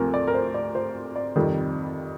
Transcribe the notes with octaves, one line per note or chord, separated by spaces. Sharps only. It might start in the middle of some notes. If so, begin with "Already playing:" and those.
Already playing: D2 C3 F3 A#4
D5
A#4
C5
D5
C5
D5
F2 C3 D#3 G3